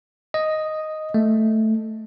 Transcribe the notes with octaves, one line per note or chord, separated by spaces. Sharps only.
D#5
A3